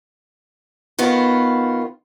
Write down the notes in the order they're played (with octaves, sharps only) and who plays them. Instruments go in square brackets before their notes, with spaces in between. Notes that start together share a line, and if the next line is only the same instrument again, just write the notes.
[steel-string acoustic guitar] D#3 B3 F4 F#4